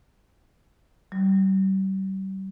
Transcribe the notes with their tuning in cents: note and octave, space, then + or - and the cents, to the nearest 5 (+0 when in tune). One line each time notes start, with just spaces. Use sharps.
G3 -35